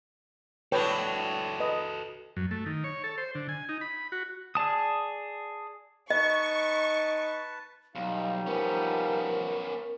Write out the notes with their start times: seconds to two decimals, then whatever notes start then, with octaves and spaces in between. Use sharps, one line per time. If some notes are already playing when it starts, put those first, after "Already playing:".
0.72 A2 F#3 D4 F#4 A4 B4 C#5 G5
1.60 B4 D#5
2.37 F#2
2.51 A3
2.66 D#3
2.84 C#5
3.04 A4
3.18 C5
3.35 D3
3.49 G#5
3.69 D#4
3.81 B5
4.12 F#4
4.55 G#4 D5 A5 D#6
6.10 D#4 B4 D#5 A5 C#6
7.95 B1 G3 D#4 F5
8.47 F3 B3 C#4 A#4